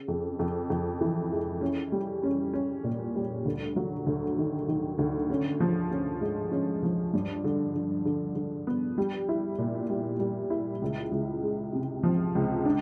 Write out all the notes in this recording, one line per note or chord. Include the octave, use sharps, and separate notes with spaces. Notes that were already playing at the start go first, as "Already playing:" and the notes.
Already playing: C#3
F2
F2
F2
E3
G#3
C#4
G3
C#4
C#4
A#2
G3
D2
F#3
D2
D#3
D#3
D2
C#4
F3
C#4
G#2
C#4
F3
G2
D3
D3
D3
D3
B3
G3
E4
A#2
G3
G3
E4
C#2
C#2
G#3
C3
F3
C#2
D4